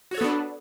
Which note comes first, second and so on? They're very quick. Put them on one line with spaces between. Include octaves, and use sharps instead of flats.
F#4 C#5 A4 B3 D4